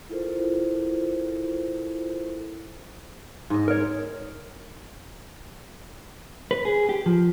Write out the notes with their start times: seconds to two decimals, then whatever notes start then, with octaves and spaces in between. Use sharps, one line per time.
0.09 E4 F4 A4 A#4 C5
3.50 G#2 D#5
3.68 A#4 C#5
6.51 B4
6.65 G#4
6.89 G4
7.06 F3